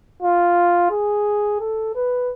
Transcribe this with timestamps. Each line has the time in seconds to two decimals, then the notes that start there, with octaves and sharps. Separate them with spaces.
0.23 F4
0.91 G#4
1.60 A4
1.95 B4